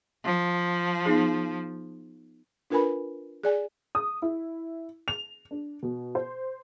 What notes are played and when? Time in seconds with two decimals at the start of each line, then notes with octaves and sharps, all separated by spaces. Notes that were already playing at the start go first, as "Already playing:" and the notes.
0.25 F3
1.05 B3 D#4 G#4
2.70 D4 F4 A#4 B4 G#5 B5
3.44 G#4 D5 G#5
3.95 D#6
4.22 E4
5.08 F7
5.51 D4
5.83 B2
6.15 C5